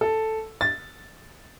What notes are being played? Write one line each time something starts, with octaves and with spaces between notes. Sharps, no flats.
A4
A6